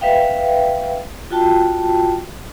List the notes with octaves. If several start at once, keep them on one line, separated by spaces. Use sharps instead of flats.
B4 E5 F5 G5
F4 F#4 G5 A5